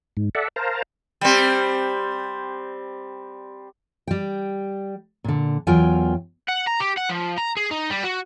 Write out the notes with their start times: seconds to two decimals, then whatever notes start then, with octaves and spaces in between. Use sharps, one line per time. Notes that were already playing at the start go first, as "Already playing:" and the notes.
0.17 G#2
0.35 A4 D5 E5 F#5
0.56 A#4 C5 F5 A5 A#5
1.21 G3 C4
4.07 G3 G5
5.24 A#2 D3
5.67 E2 F#3 F4 A#4 G5 G#5
6.49 F#5
6.67 A#5
6.81 G4
6.98 F#5
7.10 F3
7.38 A#5
7.57 G#4
7.71 D#4
7.90 G3
8.03 F#4